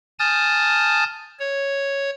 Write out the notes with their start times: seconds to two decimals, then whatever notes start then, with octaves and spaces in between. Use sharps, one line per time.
0.19 G#5 A5 D#6 F6 G6 A6
1.39 C#5